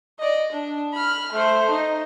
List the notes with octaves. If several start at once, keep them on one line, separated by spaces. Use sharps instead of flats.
D5 D#5
D4
B5 F6
A3 C5
D#4